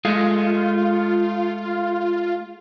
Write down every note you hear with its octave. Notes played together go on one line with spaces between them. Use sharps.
G#3 A3 F4